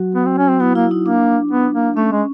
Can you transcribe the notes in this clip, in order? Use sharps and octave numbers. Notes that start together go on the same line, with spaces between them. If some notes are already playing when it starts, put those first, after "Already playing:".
Already playing: F#3 F#4
B3
C4
C#4
C4
B3 E4
A#3 E4
D#4
A#3 D4
B3
A#3
A3 C#4
G#3